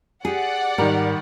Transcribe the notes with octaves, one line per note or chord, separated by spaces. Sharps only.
G4 G#4 D5 F#5
G#2 D#3 G3 A#4